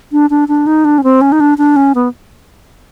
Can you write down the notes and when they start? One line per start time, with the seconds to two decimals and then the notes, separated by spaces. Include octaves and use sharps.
0.12 D4
0.30 D4
0.48 D4
0.67 D#4
0.85 D4
0.98 C#4
1.04 C4
1.21 C#4
1.32 D#4
1.40 D4
1.58 D4
1.76 C#4
1.95 B3